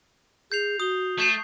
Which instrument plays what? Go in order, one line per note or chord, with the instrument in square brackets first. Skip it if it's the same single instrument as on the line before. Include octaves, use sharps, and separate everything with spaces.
[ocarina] G#4 [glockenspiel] G6 C7 F7
[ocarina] F#4 [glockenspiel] D#6 G7
[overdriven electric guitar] A3 [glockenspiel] C#6 G6 C7